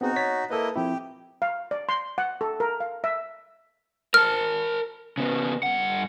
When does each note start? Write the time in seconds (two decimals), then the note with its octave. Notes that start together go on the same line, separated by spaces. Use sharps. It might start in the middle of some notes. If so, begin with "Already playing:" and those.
0.01 B3 C4 D#4 F#4 G#4
0.16 C#5 A6 B6
0.50 A#3 E4 A4 B4 D#5
0.76 F3 C4 E4 G4
1.42 F5
1.71 D5
1.89 C6
2.18 F#5
2.41 A4
2.60 A#4
2.80 F5
3.04 E5
4.14 A#4 A5 F6
5.18 C#3 B3
5.63 G2 F#5